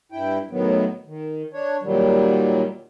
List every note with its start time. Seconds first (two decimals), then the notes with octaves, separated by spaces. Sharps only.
0.12 G2 E4 G5
0.51 A2 D#3 F#3 B3
1.07 D#3
1.53 D4 C#5
1.83 A#2 D#3 F#3 G3